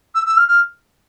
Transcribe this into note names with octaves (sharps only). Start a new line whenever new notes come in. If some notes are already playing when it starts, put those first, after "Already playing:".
E6
E6
F6
F6